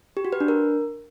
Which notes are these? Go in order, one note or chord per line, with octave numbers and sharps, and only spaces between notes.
G4
F#4
B4
D4
A#4